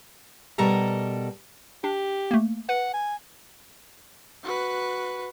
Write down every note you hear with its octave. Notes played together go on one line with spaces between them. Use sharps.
B2 G3 A4 A#4 A#5
D4 G4
A3 A#3
B4 F#5
G#5
F#4 B4